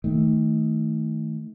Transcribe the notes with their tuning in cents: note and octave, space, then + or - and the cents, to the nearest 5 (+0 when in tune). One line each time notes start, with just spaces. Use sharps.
D#3 +20 A3 +0